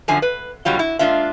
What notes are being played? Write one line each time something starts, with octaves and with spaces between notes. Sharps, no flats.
F#2 D3 F3 G#5
B4
B2 D3 F#3 G3 F4
E4
G#3 A#3 D4 F4 E5